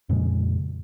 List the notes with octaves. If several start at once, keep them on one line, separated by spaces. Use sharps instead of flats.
F2 A#2 C#3 G#3